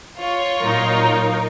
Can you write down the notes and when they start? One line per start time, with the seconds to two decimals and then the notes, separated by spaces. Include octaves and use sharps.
0.18 F4 C#5
0.60 A#2 F#3 D#4 A#4